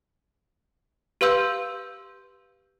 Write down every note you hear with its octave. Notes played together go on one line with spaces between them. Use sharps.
G4 B4 F5 C6 E6 G6